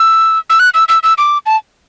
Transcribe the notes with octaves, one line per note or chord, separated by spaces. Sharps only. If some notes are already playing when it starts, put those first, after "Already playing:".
Already playing: E6
E6
F#6
E6
E6
E6
D6
A5